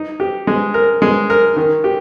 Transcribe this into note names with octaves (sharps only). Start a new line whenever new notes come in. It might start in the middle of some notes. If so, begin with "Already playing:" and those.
Already playing: D#4
G4
G#3
A#4
G#3
A#4
D#3
G4